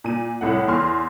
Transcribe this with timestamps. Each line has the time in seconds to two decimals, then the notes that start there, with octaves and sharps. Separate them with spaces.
0.04 A#2 D#7
0.41 C2 A2 F#5
0.68 E2 C6 F6